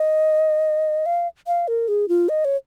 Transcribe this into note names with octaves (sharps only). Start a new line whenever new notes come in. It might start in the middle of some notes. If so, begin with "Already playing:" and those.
Already playing: D#5
F5
F5
A#4
G#4
F4
D#5
C#5